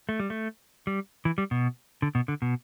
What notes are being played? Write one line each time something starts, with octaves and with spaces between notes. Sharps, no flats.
A3
G3
A3
G3
E3
G3
B2
D3
B2
D3
B2